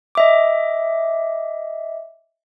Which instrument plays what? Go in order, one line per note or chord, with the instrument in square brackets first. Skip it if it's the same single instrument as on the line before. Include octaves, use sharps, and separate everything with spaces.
[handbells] D#5 E5 D6